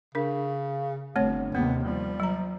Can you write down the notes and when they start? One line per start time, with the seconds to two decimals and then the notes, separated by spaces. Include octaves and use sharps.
0.15 C#3 D4 A#4
1.16 G1 A3 C4 C#5
1.55 D#2 C3 A#3 B3
1.84 F3 G3
2.20 F#3 A#5